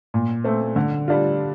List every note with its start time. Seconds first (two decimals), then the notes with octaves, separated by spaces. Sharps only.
0.14 A#2
0.44 A3 C4
0.76 D3
1.08 G3 D4 F4